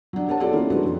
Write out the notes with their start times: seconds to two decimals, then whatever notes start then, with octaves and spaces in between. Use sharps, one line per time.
0.13 F#3 D4
0.28 G4 A#4 C#5 F#5 A5
0.40 F4 F#4 G#4 A4 C#5 D5
0.52 D#3 A#3 C#4 E4 F4
0.70 F#3 G#3 D4 F#4 A4 B4
0.85 F2